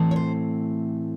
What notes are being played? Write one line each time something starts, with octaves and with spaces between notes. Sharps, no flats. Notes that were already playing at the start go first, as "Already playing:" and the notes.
Already playing: A2 E3 A3 C4
C#5
C5